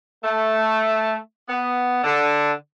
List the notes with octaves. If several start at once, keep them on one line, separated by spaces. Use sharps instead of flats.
A3
B3
D3